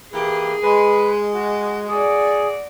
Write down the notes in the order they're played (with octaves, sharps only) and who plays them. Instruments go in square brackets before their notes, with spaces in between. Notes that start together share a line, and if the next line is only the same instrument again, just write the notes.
[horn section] E3 A#3 G4 [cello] G#4
[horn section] G#3 [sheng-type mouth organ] B4
[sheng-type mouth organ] F#4
[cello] F#4 D5 [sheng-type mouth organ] G#4